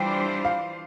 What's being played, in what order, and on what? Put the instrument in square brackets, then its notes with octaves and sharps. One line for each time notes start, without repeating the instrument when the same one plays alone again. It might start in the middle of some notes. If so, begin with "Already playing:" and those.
Already playing: [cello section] E3 G3 D4 F4 C5 [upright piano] G5
[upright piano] F5